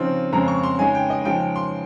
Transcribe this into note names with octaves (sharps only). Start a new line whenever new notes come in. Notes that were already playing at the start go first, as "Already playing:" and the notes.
Already playing: C#3 F3 C4 D#4
F2 C#3 G#3 C4 A#5
C#6
C6
C#3 G#3 D#4 G#5
G5
D#5
C#3 F3 G#3 D#4 G5
C6